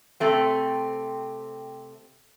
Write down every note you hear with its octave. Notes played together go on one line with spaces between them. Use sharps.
C3 A3 C4